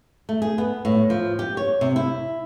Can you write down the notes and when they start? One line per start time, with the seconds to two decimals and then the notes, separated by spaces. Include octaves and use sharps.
0.29 A3
0.42 G#4
0.58 B3
0.85 A2
1.10 F3
1.39 G4
1.57 C#5
1.81 C3
1.96 E4